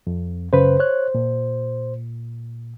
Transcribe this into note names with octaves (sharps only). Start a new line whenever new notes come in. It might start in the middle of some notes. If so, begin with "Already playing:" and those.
F2
F#2 C#3 B4 C5
C#5 F#6
A#2